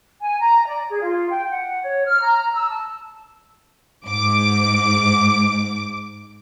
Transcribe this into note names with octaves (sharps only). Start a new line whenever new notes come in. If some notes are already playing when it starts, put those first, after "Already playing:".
G#5
A#5
D5
G#4
F4
G5
F#5
C#5
F6
A#5
E6
A5
G#2 D6